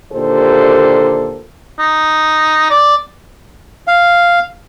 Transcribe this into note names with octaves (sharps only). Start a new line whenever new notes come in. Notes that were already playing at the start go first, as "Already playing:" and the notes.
D#2 A#2 D3 G4 A4 C5
D#4
D5
F5